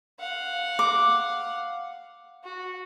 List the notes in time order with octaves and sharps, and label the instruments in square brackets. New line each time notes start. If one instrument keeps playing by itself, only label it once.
[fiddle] F5 F#5
[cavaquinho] D6
[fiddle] F#4